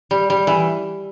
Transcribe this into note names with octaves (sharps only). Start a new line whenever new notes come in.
G3
G3
E3